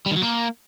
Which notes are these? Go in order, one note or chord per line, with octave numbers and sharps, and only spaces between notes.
G3
D#3
F#3
A#3